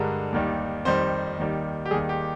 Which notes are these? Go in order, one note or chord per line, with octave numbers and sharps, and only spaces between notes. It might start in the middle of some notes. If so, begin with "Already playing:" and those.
Already playing: G2 D3 G#3 A#4
D#2 D#3 G3
F2 D#3 G3 C5
D#2 D#3 G3
G4
D#2 D#3 G3 G#4
G4